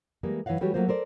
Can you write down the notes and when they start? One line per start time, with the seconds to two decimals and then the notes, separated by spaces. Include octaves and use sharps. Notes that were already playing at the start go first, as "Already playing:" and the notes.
0.23 E3 G3 G#3 A#3
0.46 G2 E3 C#5 D#5 F5 F#5
0.61 E3 G3 A3 F#4 G4 C#5
0.74 F#3 A3 A#3 F4 C5
0.88 A4 A#4 C5 D5